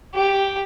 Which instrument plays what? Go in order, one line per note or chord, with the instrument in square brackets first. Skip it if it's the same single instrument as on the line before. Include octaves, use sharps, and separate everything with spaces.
[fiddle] G4